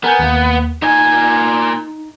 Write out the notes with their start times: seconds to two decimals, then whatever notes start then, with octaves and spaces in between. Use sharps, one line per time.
0.04 B3 A#4 G#5 G6
0.19 D#2 A#3
0.82 A#2 D#4 G#5